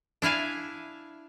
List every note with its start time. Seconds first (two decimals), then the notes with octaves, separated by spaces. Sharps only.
0.22 D4 E4 F5 G#5